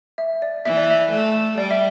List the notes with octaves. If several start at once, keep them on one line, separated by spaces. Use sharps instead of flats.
E5
D5
E3 E5
D5
E5
A3
G3 D5
E5